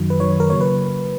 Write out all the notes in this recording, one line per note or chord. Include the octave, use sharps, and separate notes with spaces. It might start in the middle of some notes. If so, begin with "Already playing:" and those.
Already playing: F#2 D#3 F#3
B4
F#2 D#3 F#3 C#5
A#4
C#3 F#3 A#3 C#5
B4